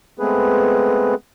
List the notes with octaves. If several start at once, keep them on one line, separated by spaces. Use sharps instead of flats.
G#3 A3 B3 C4 G#4 B4